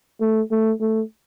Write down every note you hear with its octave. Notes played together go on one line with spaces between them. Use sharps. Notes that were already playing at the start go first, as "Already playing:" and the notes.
A3
A3
A3